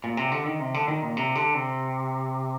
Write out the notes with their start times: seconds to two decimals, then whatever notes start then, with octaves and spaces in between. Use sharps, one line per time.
0.04 A#2
0.17 C3
0.32 D3
0.46 D#3
0.60 C3
0.74 D3
0.88 D#3
1.02 A#2
1.17 C3
1.35 D3
1.54 C3